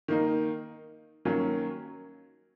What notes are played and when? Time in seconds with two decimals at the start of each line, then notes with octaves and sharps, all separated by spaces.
0.08 D#3 A#3 D#4
1.25 D#3 F#3 A#3 C#4